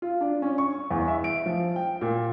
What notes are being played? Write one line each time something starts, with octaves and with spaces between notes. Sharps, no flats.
F4
D4
C#4
C#6
E2
E5
D7
F3
G5
A#2